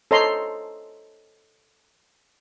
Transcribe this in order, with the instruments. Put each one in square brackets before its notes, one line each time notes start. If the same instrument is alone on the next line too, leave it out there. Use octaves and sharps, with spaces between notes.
[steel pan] A4 C5 C#5 D#5 A#5 C6